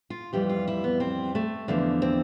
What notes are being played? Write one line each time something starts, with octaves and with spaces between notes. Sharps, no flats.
F4
F2 E3 G3 G4
F4
E4
B3
C4
A3
E2 D3 F3
C4